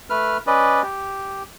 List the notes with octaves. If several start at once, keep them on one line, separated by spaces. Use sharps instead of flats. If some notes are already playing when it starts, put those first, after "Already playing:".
A3 B4 F6
C#4 B4 D5 D#5
G4